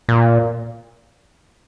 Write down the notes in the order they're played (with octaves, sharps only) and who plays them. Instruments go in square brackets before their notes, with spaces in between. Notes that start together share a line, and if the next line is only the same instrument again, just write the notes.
[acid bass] A#2